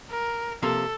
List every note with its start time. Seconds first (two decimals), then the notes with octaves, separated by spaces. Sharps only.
0.10 A#4
0.63 C3 F3 A#3 A4